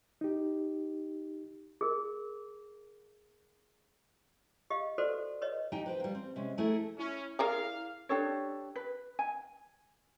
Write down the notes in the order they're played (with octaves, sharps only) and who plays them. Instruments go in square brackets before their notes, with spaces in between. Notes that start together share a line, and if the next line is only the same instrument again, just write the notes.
[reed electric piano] D#4 G4
[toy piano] G#4 A#4
G4 D#5 F5
F#4 A4 B4 C5 D5
B4 C#5 D#5
[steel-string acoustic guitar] D#4 G4 D#5 G5 G#5
B4 C5 G5
G3 A#3
C4
C3 G#3 C#4
A3 E4 G#4 A#4
[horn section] C#4 [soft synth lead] E4
[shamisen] G#4 A#4 D5 [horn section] F5
[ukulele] D4 G4 A4 C#5
B4
G#5